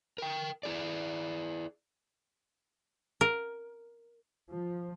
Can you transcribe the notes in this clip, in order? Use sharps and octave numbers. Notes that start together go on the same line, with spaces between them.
A#4 G5
E4 G#4 D5
A#4
F3